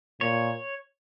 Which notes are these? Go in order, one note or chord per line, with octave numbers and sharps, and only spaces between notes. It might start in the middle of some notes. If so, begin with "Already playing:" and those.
A#2 C#5